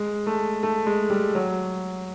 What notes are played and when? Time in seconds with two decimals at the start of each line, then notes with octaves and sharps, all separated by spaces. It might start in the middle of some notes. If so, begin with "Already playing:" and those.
Already playing: G#3
0.27 A3
0.63 A3
0.87 G#3
1.10 G3
1.35 F#3